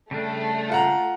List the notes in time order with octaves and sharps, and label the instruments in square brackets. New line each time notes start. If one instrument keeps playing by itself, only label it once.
[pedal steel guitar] C#3 G3 D4 [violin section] A3
[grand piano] F4 F#5 A#5